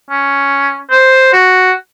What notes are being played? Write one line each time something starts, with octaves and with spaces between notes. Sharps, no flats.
C#4
C5
F#4